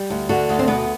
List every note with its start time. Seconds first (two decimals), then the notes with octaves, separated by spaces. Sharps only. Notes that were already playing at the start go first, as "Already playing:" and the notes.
Already playing: G3
0.10 D2
0.29 D3 D4 F#4
0.49 D2
0.59 C4
0.67 B2 B3